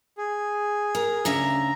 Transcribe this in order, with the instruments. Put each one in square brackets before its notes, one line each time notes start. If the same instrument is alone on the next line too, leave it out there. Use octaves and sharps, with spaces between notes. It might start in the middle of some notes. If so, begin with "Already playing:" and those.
[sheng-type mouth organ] G#4
[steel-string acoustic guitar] A#4
[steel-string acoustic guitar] D2 C#3 E5 [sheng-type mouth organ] A#5